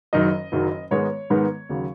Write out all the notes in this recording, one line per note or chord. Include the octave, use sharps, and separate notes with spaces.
F#1 F#2 D#3 F#3 D#5
F#1 F#2 D#3 F#3
G#2 D#3 G#3 B3 C#5
G#2 D#3 G#3 B3
D#2 C#3 F#3